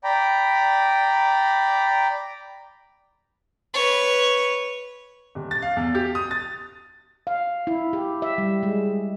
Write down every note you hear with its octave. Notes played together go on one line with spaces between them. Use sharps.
D5 G5 A#5 B5
B4 C#5
D#1
A6
F5
E2
G4
D#6
A6
F5
E4
G4
E5
G3
G#3